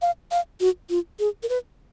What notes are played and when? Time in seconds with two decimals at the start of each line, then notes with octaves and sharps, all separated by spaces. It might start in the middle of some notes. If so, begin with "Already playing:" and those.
0.02 F5
0.31 F5
0.60 F#4
0.90 F4
1.20 G#4
1.43 A#4
1.49 B4